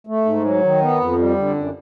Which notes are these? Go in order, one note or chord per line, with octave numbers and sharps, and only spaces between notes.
A3
G#2
F#3
D#3
B3
F2
G3
D3
F#2